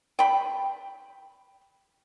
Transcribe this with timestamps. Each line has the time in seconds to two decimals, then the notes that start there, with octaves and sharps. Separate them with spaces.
0.19 G5 B5